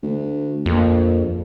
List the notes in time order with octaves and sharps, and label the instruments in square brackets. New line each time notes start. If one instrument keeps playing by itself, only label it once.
[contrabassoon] D2
[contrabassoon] A#1 [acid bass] F2